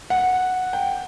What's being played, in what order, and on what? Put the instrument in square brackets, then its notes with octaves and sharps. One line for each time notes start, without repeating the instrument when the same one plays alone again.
[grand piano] F#5
G5